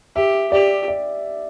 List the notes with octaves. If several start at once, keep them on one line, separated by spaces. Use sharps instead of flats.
G4 E5
G4 D5
D5